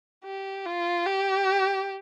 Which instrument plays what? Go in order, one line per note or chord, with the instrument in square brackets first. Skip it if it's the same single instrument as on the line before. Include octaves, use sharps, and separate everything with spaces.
[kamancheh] G4
F4
G4